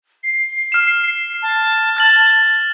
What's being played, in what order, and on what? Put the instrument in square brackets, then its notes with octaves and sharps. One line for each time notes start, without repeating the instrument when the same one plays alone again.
[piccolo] C7
[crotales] F6 E7
[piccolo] A5
[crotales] F6 A6 F#7